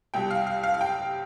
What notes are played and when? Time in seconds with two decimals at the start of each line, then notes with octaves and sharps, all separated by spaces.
0.14 C2 B2 G3 G5
0.31 F5
0.47 F5
0.63 F5
0.74 F5
0.81 G5